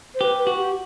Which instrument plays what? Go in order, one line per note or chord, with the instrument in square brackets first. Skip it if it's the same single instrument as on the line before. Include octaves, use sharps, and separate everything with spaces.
[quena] C5
[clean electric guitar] G4 [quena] B4
[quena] B4
[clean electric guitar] F#4
[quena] G4